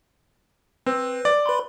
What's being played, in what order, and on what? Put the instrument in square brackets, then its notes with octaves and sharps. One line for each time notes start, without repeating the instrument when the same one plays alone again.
[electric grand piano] C4 [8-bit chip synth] B4
[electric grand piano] D5
[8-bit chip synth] B4 B5 C6